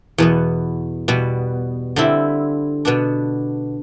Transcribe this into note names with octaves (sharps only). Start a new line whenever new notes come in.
E2 B2 B3
B2 G3 B3
D3 G3 C4 E4
B2 B3 D4